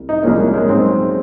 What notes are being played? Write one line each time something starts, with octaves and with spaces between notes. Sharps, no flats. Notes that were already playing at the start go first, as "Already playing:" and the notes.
Already playing: C2
D#4
C2 A#2 F3 G#3 A#3 C#4
A#3
G#3
G#2 F#3 C4 C#4 G#4